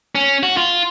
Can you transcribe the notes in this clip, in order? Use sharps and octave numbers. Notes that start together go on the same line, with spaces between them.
C#4
F#4
F4